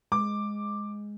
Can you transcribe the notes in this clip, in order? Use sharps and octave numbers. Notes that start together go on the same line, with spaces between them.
G#3 D6